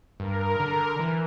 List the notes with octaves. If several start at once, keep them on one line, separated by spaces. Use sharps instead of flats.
G2 A#4
D3
E3